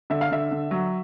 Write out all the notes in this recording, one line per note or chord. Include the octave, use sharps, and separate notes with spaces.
D3 E5
F5
D3 E5
D3
F#3